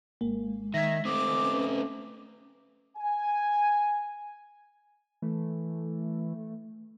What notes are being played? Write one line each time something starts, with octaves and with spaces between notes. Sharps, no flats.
G#1 G#3 A#3
D#3 E5 G#6 A#6
A3 C4 D6 D#6
C#4 B4
G#5
E3 A3